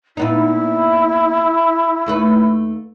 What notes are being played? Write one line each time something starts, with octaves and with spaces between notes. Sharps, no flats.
A#2 B3 D#4 E4
D#2 A3 B4